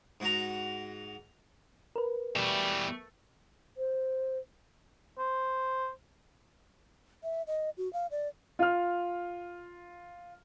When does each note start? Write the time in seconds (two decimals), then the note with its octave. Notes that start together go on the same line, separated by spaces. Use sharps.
0.20 G#2 F#4 A#5
1.96 A#4 B4
2.36 B2 E3 G3 A3
3.77 C5
5.18 C5
7.23 E5
7.47 D#5
7.77 F#4
7.93 F5
8.11 D5
8.59 F4 F6